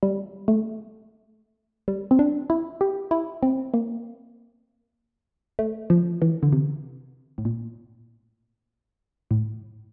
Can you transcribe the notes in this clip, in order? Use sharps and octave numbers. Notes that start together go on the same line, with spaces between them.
G3
A3
G3
C4
D4
E4
G4
E4
C4
A#3
A3
F3
E3
D3
C3
A2
A#2
A2